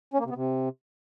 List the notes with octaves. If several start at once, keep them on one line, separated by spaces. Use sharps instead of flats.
C#4
A#3
C3
B3
C3